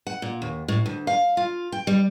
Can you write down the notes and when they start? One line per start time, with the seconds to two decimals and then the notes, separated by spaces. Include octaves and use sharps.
0.07 F#5
0.22 A#2
0.42 D#2
0.68 A2
0.86 D2
1.07 F5
1.37 F4
1.72 G5
1.87 G3